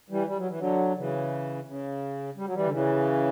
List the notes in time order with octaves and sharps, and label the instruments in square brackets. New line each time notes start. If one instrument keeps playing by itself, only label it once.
[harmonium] E3 G3
G3
F#3
E3
D3 F#3
C#3 E3
C#3
G3
F#3
E3 G3
D3
C#3 E3